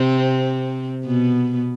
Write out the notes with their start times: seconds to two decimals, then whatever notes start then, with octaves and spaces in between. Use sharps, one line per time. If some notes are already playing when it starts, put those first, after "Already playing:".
Already playing: C3 C4
1.06 B2 B3